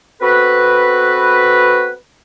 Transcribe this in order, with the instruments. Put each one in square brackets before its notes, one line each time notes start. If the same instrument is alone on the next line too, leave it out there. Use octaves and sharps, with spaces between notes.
[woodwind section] B3 C4 F#4 A4 B4